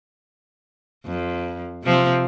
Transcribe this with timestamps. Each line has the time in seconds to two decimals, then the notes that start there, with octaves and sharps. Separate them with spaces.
1.06 F2
1.83 C3 F3 C4